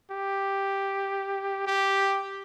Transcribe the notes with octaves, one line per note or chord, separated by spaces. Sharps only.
G4
G4